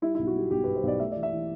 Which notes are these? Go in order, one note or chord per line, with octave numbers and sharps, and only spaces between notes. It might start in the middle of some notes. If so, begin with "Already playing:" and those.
G3 E4
B1 E4
F#4
G3 G4
B1 G4
B1 B4
C5
B1 D5
A3 E5
E3 D5
E5
E3